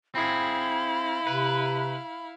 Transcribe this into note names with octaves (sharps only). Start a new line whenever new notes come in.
C4 E4 G#4 F5 B5
C3 B4